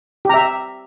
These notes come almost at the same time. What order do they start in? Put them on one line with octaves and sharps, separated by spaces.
G4 A#5 E5